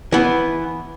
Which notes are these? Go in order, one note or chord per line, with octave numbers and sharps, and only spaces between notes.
E3 B3